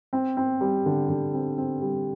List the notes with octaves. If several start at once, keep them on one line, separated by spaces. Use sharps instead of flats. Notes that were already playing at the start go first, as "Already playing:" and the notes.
C4
C4
G3
D3
D3
C4
C4
G3